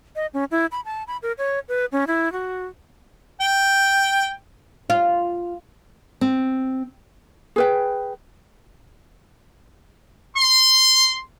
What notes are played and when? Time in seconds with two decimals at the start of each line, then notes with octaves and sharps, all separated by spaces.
0.16 D#5
0.34 C#4
0.51 E4
0.72 B5
0.85 A5
1.07 B5
1.22 A#4
1.38 C#5
1.69 B4
1.92 C#4
2.07 E4
2.32 F#4
3.41 G5
4.90 F4
6.21 C4
7.56 G#4 B4 G5
10.37 C6